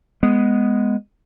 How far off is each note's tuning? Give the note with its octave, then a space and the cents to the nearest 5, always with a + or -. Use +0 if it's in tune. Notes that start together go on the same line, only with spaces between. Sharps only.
G#3 +0 B3 +0